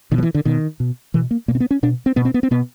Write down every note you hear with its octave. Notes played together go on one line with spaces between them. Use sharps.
B2 D#3
F3
E3
D3
B2 D#3
B2
B2 E3
A#3
B2 A#3
C4
B3
C#4
B2 D4
C4
B2 B3
C4
B3
C4
B2 B3